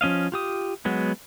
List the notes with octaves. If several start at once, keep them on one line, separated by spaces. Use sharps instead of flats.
F3 C#4 D#5 F5
F4 G4 D#6
F#3 G#3 B3